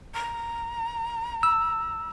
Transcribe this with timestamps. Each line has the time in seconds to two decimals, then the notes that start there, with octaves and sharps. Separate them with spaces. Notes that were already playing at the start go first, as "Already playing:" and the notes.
0.14 A#5
1.43 E6